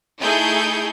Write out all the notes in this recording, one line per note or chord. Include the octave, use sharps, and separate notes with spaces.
A3 D#4 E4 G#4 G6